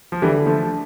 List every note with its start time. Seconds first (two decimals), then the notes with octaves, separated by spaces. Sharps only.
0.12 F3
0.22 D3 E3 G3
0.46 F3 A3